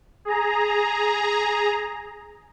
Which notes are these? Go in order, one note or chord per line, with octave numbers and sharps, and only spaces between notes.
G#4 A#5